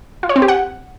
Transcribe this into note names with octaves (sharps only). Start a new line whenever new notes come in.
F4
C#5
C4
G4
F#5